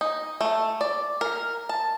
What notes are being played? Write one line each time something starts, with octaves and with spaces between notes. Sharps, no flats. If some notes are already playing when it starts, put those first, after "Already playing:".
D#4
A3
D5
A#4
A5